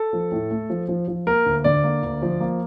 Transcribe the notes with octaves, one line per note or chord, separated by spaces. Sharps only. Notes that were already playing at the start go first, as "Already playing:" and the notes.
Already playing: A4
F3
A2
A3
F3
F3
F3
A#3 A#4
D2
D3 D5
A#3
D2
F3
A#3